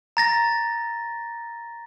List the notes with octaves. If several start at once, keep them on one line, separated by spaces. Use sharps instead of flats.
A#5 A6 A#6